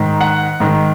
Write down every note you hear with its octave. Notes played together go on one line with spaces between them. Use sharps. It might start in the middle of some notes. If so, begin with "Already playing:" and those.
Already playing: G#2 D#3
F#5
G#2 D#3